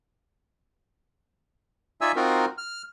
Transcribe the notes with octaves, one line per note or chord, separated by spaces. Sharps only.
D#4 F4 D5 E5 G#5 E6
C4 D#4 F4 F#4 A#4
F6